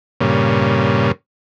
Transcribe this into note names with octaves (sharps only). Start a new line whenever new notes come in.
G2 A#2 C#3